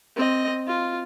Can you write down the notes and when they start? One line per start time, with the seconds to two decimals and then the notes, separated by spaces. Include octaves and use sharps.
0.16 C4 D#5
0.67 F4